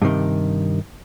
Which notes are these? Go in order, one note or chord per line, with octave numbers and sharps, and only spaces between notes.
G2 C3 D#3